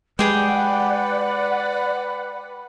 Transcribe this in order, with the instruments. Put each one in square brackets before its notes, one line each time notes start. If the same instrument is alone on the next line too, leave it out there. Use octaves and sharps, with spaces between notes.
[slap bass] G#3 [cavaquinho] G4 G#4 G5 [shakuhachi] B4 [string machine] D5 F#5